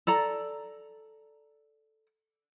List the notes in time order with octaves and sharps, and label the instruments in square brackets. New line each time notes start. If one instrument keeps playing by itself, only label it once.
[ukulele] A4 D5 A#5